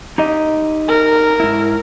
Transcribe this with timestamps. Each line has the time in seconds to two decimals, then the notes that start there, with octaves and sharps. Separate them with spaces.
0.18 D#4 G4 D#5
0.89 A#4
1.40 G#2 E4